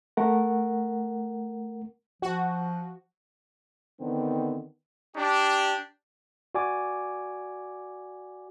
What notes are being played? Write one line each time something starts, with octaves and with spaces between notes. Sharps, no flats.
A3 A#4 F#5
F3 F#4
D3 D#3 B3 C4 D4
D4 G4
F#4 D5 G#5 D6